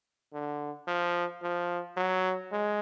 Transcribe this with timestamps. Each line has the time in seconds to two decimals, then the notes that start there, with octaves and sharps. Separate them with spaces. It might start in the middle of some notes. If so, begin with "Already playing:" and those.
0.33 D3
0.87 F3
1.42 F3
1.97 F#3
2.52 G#3